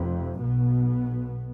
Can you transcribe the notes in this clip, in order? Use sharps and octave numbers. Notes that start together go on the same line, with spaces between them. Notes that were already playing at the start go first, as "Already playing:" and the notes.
Already playing: F1 F2 C3
B1 B2 B3